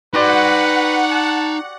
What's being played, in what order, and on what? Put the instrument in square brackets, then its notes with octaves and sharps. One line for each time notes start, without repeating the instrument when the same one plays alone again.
[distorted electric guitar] D#4 C6 [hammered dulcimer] F#4 G4 D5 [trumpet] B4 [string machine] F#5
[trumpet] A5